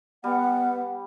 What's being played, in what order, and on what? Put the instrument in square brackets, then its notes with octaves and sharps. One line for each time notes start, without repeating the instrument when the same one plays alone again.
[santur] G3 [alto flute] B3 [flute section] F#5